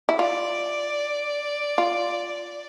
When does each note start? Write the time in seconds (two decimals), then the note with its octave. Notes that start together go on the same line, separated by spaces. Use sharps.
0.09 E4
0.19 F4 D5
1.78 F4